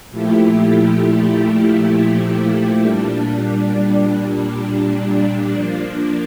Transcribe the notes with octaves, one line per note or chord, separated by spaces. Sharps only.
A#2 F3 A3 E4 G4
A#2 G3 D4
F3 A#3 D4